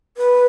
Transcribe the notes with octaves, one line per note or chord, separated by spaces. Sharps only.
B4